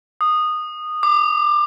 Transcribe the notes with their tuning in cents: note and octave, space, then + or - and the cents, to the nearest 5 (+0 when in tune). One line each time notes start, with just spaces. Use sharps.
D#6 -15
D6 +25